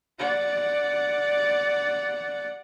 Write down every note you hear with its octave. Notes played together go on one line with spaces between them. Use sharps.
D5 F#5